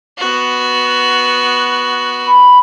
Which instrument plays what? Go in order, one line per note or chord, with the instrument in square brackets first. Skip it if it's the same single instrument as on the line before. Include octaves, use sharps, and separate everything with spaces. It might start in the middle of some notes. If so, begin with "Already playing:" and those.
[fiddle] B3 F#4
[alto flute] B5